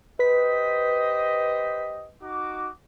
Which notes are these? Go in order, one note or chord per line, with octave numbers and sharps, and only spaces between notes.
G4 B4 C5 D#5 B6
D#4 F#4 D6